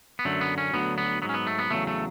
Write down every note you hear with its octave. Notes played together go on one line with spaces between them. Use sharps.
B3
F#2 D3 F#3 A3
B3
C#4
D2 D3 F#3 B3
B3
G#2 F#3 B3
C#4
B3
A3
B3
E2 C#3 F#3 A3
A3